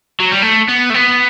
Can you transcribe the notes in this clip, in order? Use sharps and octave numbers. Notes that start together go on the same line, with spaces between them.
F#3
G3
A3
B3
A3
B3